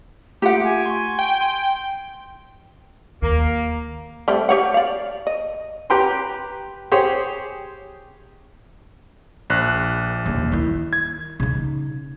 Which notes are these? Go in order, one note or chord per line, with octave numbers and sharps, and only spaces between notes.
A3 F4 G4 F#5 D6
G#5
C6 C#6
G5
C6
D#2 A#3
G3 A3 C4
G4 C#5 F#5
D5 F5
D#5
G4 B4 G5 A#5 C6
G4 G#4 C5 C#5
A#1 F#6
D#2 C#3
D#3 E4
G#6
C#3 D#4